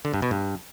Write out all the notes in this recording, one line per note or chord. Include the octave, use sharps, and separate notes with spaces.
D3
G2
B2
G2